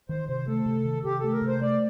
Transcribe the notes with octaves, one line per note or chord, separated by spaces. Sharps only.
D#3 C5
C3 C5
A3 A4
C3
D#3
C3 G4
A3 A4
A#4
C3
C5
A3 D5